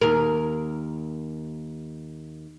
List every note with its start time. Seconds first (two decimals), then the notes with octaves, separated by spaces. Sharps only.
0.01 D#2 A#4